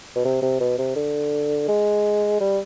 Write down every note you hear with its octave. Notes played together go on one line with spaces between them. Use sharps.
B2
C3
C3
B2
C3
D3
G#3
G3